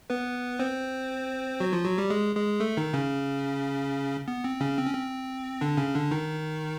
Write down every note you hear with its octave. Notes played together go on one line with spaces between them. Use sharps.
B3 B4
C4 C5
F#3 F#4
F3 F4
F#3 F#4
G3 G4
G#3 G#4
G#3 G#4
A3 A4
D#3 D#4
C#3 C#4
B3
C4
C#3 C#4
C4
C#4
C4
D3 D4
C#3 C#4
D3 D4
D#3 D#4